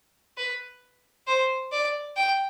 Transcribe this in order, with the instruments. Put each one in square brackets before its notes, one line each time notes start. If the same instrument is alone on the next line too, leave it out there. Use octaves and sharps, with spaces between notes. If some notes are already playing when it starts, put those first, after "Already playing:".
[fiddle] B4
C5
D5
G5